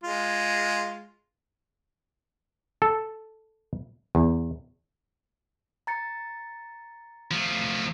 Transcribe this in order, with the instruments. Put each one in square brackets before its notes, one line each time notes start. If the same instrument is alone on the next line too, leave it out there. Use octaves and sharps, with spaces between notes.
[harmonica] G#3 F4
[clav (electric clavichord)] A4
E2
[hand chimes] A#5 A6 C#7
[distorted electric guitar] F3 A3